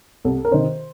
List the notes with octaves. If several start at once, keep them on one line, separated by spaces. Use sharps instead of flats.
C2 A4
A#4
C3 D#3 C5